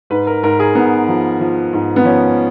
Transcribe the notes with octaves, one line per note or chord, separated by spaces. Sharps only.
G#2 B4
A#4
G#2 A#4
G#4
G#2 B3
F3
F3
G#2
B3
F3 C#4